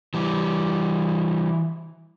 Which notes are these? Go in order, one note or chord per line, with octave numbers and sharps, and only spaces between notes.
E3 G3